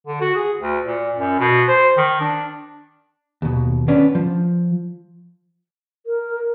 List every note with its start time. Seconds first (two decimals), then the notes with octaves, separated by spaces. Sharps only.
0.07 D3
0.21 F#4
0.35 G#4
0.60 D2
0.84 A#2
1.16 F#2
1.39 B2
1.68 C5
1.97 D#3
2.21 D4
3.42 D#2 B2
3.88 B3 C#4 D4
4.15 F3
6.06 A#4